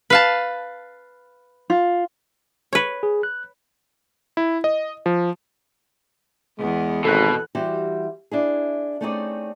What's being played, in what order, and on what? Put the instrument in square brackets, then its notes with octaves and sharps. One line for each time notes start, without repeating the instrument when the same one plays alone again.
[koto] B4 F5 A5
[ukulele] F4
[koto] B4 C#5
[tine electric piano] G#4
F#6
[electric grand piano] E4
D#5
F3
[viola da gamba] E2 B3 [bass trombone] G#3
[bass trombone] G#1 [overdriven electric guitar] B2 [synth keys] A4 F#6
[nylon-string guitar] E3 G3 F#4 G4 C5
D4 E4 G#4
A3 C4 C#4 D#4 G#4 D5